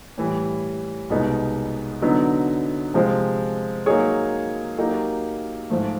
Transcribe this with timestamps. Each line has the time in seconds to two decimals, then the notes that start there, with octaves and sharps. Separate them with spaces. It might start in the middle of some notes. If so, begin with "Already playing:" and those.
0.18 A2 E3 G3
1.10 C2 B2 G#3 B3 D#4
2.02 D3 F#3 B3 D#4
2.94 C3 F3 G#3 C4
3.86 F#3 A#3 D#4 G#4 C#5
4.78 F#3 A#3 D#4 G4 A#4
5.70 G#2 F3 A3